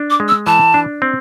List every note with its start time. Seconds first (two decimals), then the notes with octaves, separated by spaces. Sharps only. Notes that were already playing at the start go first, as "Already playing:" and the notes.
Already playing: D4
0.10 D6
0.20 G#3
0.28 E6
0.47 E3 A5
0.74 D4
1.02 C4